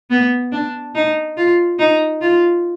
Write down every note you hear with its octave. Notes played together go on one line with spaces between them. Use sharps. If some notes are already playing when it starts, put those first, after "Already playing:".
B3
D4
D#4
F4
D#4
F4